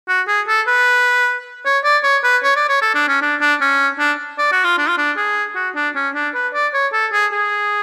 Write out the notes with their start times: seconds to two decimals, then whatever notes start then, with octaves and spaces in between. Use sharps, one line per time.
0.08 F#4
0.28 G#4
0.48 A4
0.67 B4
1.65 C#5
1.84 D5
2.03 C#5
2.24 B4
2.43 C#5
2.56 D5
2.69 C#5
2.82 A4
2.95 D4
3.08 C#4
3.22 D4
3.41 D4
3.61 C#4
3.99 D4
4.38 D5
4.52 F#4
4.64 F4
4.78 D4
4.89 F4
4.98 D4
5.17 G#4
5.55 F#4
5.75 D4
5.95 C#4
6.15 D4
6.34 B4
6.54 D5
6.74 C#5
6.93 A4
7.13 G#4
7.32 G#4